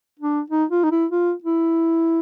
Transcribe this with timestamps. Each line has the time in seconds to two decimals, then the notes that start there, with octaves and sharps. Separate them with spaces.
0.19 D4
0.50 D#4
0.71 F4
0.83 D#4
0.91 E4
1.11 F4
1.43 E4